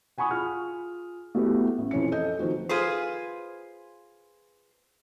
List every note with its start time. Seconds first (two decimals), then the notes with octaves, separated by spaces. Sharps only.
0.18 F#5 G#5 B5 C#6 D#6
0.31 F4 G#4 F6
1.35 A3 B3 E4 F#4 G4 B4
1.78 A1
1.91 F2 E3 C#4 C#7
2.12 A4 D#5 G6
2.39 D#3 F3 C4 F#4
2.69 F4 G#4 B4 C5